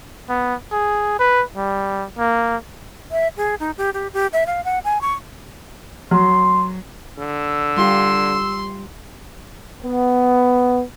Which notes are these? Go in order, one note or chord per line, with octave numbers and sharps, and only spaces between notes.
B3
G#4
B4
G3
A#3
E5
G#4
D#4
G4
G4
G4
E5
F5
F#5
G#5
C#6
F#3 C6
D3 E6
G3 F4 G4 C6
B3